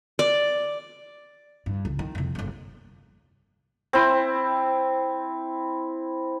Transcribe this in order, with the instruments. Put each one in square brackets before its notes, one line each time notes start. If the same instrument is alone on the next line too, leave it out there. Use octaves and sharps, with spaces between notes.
[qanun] D5
[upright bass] G2
C#2
D#3
F2 C3
G1 A#3
[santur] C4 E4